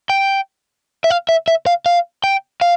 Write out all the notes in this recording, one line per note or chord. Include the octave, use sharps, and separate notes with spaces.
G5
E5
F5
E5
E5
F5
F5
G5
F5